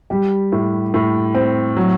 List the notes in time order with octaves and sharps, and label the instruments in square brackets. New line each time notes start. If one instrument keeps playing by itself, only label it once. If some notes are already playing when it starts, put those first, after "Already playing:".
[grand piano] G3 [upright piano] G4
[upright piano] A2
A2
C4
[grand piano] F#3